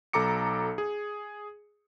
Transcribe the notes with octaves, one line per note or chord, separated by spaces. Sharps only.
B1 A4 A#5 D6 C#7
G#4